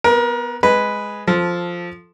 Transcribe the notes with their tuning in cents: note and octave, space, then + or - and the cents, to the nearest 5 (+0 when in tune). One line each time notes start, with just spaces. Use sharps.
B3 +0 A#4 +30
G#3 +0 B4 +0
F3 +0 A4 +0